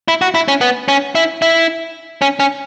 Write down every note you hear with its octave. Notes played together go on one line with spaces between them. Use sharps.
E4
F#4
E4
C#4
B3
C#4
E4
E4
C#4
C#4